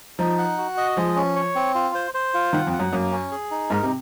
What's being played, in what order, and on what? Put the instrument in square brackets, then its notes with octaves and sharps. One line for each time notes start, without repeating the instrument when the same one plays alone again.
[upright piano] F3 [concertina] D#4
[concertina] F#5
F#4
D#5
[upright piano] F3 [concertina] G#3
[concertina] C#4
C#5
C4
F4
C5
C5
F4
[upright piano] D#3 [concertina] F#5
[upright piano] F2
[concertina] F#5
[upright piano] F#2
[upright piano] F#2 [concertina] A#3
[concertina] C#4
G#4
D#4
[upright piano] G#2 [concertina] A#4
[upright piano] C3